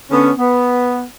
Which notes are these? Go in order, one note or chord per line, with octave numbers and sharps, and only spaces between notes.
D3 B3 C#4
B3